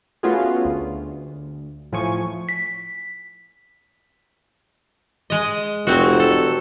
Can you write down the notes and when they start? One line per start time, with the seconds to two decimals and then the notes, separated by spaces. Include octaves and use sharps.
0.23 A3 B3 C#4 F4 F#4 G#4
0.65 D2
1.92 A2 F3 G#5 C#6
2.49 B6
5.30 G#3 D#5
5.87 F1 F#3 C4 F#4
6.20 A4